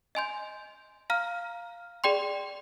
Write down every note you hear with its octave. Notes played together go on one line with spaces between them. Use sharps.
D#5 G#5 C6 G6
F5 A#5 F6
G#4 D5 G5 C6